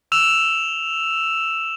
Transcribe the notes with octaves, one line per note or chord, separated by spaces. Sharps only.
E6 E7 F7